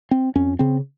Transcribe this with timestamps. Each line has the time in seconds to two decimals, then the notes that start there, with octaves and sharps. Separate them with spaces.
0.11 C4
0.35 F2 C#4
0.59 C#3 C4